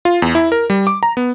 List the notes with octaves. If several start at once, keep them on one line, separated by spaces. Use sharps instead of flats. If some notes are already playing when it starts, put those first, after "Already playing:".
F4
E2
E4
A#4
G3
D6
A#5
B3